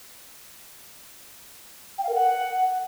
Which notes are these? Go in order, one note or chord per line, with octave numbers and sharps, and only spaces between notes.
G5
F5
A#4
F#5